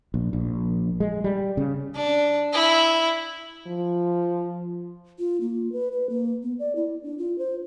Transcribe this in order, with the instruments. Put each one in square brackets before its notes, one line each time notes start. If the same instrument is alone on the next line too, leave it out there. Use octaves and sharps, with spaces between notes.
[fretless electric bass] A#1
A#1
G#3
G3
C#3
[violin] D4
E4
[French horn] F3
[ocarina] F4
A#3
B4
B4
A#3
B3
D5
E4
D4
F4
C5